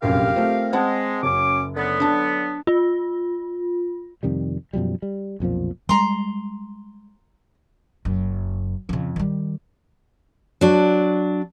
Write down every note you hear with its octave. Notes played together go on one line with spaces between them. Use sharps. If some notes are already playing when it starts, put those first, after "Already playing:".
F1 A#1 F#2 G4 A#4 F5
A3 C4 F4
G#3 C4 F#5 A5
F#1 F#3 C#4 D6
D3 F#3 B3
D4 A5
F4
F2 C3 D#3 G3
F#2 B2 F3 G3
G3
B1 F2 A#2 F3
G3 G#3 A#5 C6
F#1 F#2
F2 C#3
D#3 G3
F#3 D4